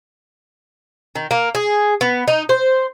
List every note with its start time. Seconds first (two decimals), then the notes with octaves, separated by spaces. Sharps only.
1.15 D#3
1.31 A#3
1.55 G#4
2.01 B3
2.28 D#4
2.49 C5